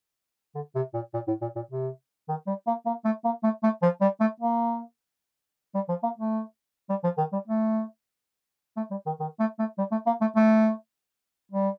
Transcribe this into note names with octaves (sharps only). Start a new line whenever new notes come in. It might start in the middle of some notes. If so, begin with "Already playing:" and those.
D3
C3
A#2
A#2
A2
A#2
A#2
C3
D#3
G3
A#3
A#3
A3
A#3
A3
A3
F3
G3
A3
A#3
G3
F3
A#3
A3
G3
F3
D#3
G3
A3
A3
G3
D#3
D#3
A3
A3
G3
A3
A#3
A3
A3
G3